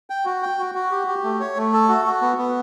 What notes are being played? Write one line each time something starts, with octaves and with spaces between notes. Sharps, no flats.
G5
F#4
G5
F#4
F#4
G4
G4
A3
C#5
A3
A4
F#4
F#4
B3
B3